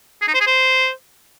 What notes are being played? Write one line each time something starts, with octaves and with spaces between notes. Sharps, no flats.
G#4
D#4
C5
G#4
C5